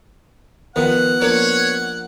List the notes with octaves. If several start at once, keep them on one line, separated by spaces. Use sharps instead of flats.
D#3 F3 B3 F#5
F3 A#3 D4 C#5